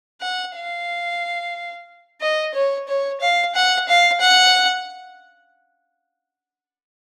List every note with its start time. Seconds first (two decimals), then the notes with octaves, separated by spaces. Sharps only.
0.21 F#5
0.56 F5
2.21 D#5
2.54 C#5
2.88 C#5
3.21 F5
3.55 F#5
3.88 F5
4.20 F#5